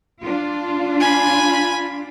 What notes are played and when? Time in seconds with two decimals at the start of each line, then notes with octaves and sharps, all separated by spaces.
0.22 D4 F4
1.00 G#5 B5